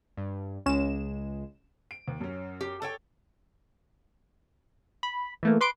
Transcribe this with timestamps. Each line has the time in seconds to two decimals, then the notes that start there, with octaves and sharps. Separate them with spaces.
0.17 G2
0.66 C#2 G#3 C#4 E7
1.91 D7
2.08 D#2
2.20 F#2 C#4
2.61 G4
2.82 A4 C#5 G5
5.03 B5
5.43 E3 A3 A#3
5.61 B4 C6 D6 D7